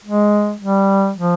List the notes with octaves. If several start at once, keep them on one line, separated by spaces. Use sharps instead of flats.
G#3
G3
F3